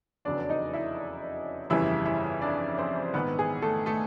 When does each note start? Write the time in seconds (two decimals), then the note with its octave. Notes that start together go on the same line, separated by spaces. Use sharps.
0.25 F1 E2 C#3 F#3 D4 D5
0.49 D#4 D#5
0.74 E4 E5
1.70 G1 F2 C#3 E3 G3 E4 E5
2.06 E4 E5
2.42 D4 D5
2.78 C4 C5
3.14 A#1 G#2 D#3 B3 B4
3.39 G#4
3.62 A3 A4
3.86 A3 A4